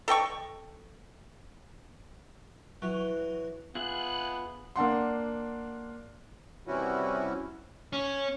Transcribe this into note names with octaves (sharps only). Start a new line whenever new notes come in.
A4 D#5 G5 C#6
E3 F#3
B3 F4 G#4 E5 F#6
A#3 D4 F#5 C6
C3 E3 G3 C#4 E4 F#4
C#4